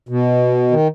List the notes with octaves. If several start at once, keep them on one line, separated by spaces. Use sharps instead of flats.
B2
D#3